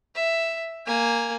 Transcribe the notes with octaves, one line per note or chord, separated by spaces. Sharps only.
E5
A#3 G#5